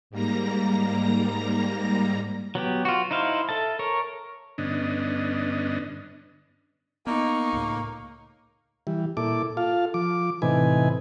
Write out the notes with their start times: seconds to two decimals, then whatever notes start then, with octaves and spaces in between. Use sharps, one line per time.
0.10 G#2 G3 A#3 A#5 A#6
2.55 F#3 B3 G4
2.85 F4 F#4
3.11 D#4 E4 C5 F5
3.49 A4 E5 A5
3.79 A#4 C#5
4.58 G2 D3 B3 C#4 D4 D#5
7.07 A#3 B3 D#4 C#6
7.53 C#2 A2
8.87 E3 G3
9.17 A#2 E4 A4 D6
9.57 F4 A4 F5
9.94 F3 D6
10.42 A2 C3 E3 D#4 B4 G#5